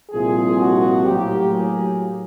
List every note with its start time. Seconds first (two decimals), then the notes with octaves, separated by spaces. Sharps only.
0.11 C2 A#2 F3 G#4
0.58 F#4
1.03 A2 F#3 A#3 G4
1.51 G#4